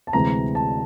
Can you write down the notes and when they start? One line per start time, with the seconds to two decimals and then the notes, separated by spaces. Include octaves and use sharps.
0.07 A5
0.13 D2 C3 E3 G#3 C4 A#5
0.55 A5